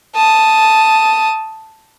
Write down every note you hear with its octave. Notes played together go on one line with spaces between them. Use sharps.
A5 D#6